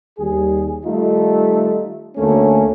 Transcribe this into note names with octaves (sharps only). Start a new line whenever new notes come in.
D#2 G3 G#4
D#3 G3 A3 D#4 F4
D2 A3 A#3 C#4